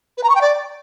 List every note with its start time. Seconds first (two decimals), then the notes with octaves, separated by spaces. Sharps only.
0.17 B4
0.23 A#5
0.29 C#6
0.35 G5
0.41 D5